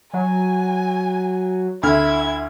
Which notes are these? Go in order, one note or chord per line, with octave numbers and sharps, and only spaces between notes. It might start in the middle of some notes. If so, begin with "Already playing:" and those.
F#3 G#5
D2 D3 E4 F6 G#6